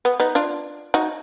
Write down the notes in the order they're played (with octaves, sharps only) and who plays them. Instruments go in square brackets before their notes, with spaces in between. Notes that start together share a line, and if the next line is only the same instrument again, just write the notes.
[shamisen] B3
B3 D#4
D4 F4
D#4 F#4